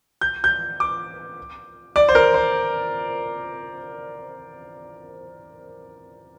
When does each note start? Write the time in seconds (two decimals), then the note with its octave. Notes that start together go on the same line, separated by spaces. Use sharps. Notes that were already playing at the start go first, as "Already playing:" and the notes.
0.21 G6
0.44 G6
0.80 D6
1.96 D5
2.09 C5
2.15 A#4
2.34 C5